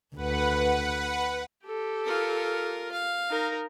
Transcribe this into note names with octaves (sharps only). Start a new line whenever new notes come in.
D2 B4 F#5
G4 A4
F4 A#4
F5
D#4 A#4